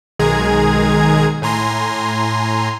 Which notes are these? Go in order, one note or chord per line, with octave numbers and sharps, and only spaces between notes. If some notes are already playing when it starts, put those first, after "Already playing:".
B1 D#3 G#3 G#4 A#5 G#6
A2 G#5 A#5 C6